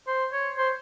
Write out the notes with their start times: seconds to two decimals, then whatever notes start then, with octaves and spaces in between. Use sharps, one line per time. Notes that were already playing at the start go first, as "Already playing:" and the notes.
0.07 C5
0.33 C#5
0.58 C5